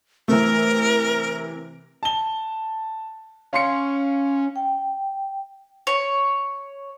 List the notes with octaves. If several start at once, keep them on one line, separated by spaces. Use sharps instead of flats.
C3 E3 A3 A#4 E6
A5 G7
C#4 F5 C6 C#7
G5
C#5